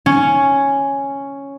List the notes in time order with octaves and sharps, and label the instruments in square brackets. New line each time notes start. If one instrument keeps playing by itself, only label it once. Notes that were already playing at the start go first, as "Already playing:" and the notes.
[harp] C#4